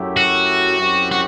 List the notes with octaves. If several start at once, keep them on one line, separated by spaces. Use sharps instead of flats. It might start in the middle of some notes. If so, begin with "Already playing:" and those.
Already playing: F#2 F#3 A3 E4 G4
F#4
F#2 F#3 C4 E4 G4
F#4